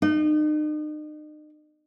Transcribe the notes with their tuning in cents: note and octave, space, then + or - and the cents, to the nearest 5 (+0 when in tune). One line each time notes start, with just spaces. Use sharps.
D#4 -40